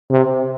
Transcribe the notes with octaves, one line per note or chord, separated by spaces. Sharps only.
C3